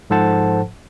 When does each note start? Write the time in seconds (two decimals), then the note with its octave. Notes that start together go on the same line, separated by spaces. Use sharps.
0.10 G#2 F3 A4 C5 F#5 A5